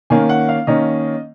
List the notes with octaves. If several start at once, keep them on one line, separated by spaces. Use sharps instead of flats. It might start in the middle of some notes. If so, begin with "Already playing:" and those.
D#3 A#3 C#4 G#5
F#5
F5
D#3 A#3 C#4 D#5